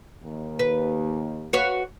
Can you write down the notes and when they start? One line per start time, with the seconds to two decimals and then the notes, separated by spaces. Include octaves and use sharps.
0.23 D#2
0.59 B4
1.53 F#4 B4 C#5